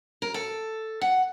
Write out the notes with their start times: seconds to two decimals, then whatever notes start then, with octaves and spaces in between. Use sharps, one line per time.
0.22 A#4
0.34 A4
1.01 F#5